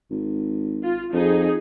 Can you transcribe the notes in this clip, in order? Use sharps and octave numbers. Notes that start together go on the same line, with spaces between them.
G#1
F4
F2 D#4 G#4